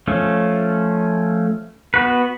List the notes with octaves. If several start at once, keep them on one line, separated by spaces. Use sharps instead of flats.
F3 A3 C#4
B3 F#4 B4